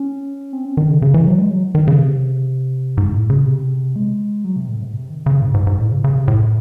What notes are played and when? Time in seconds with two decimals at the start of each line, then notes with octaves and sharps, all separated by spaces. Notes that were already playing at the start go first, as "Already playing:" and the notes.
Already playing: C#4
0.53 C4
0.65 C#4
0.77 D#3
0.90 C#3
1.02 C#3
1.14 E3
1.27 F#3
1.38 G#3
1.50 F#3
1.75 D#3
1.88 C#3
2.00 C3
2.98 G#2
3.14 A2
3.30 C#3
3.46 C3
3.96 G#3
4.44 F#3
4.56 C3
4.68 A2
4.82 G#2
4.93 C3
5.10 D#3
5.26 C#3
5.42 G#2
5.54 G#2
5.67 G#2
5.79 A2
5.91 C#3
6.04 C#3
6.16 C3
6.28 A2